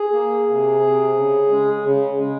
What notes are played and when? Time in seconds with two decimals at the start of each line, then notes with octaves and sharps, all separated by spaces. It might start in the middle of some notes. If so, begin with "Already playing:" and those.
Already playing: G#4
0.13 A#3
0.48 C3
0.81 C3
1.15 C#3
1.49 G#3
1.83 C#3
2.17 G#3